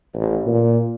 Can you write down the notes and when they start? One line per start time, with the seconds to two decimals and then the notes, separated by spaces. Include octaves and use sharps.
0.14 A1
0.46 A#2